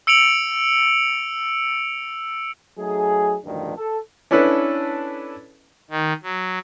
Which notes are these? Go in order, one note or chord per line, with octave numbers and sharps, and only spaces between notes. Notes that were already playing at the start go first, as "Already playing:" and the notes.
E6 C#7 D7 F7 F#7
F#3 A3 D#4 G#4
A1 D2 G2 D#3 F3 D4
A4
C#4 D4 E4 A4 B4
D#3
F#3